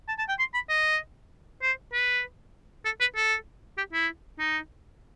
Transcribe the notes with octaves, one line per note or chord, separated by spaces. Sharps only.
A5
A5
G5
C6
B5
D#5
C5
B4
A4
B4
A4
G4
E4
D#4